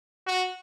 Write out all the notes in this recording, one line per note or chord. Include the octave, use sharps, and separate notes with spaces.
F#4